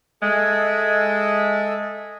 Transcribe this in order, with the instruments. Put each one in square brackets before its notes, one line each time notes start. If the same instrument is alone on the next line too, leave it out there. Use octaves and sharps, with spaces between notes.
[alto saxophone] G#3 [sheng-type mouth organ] A4 D#5 E5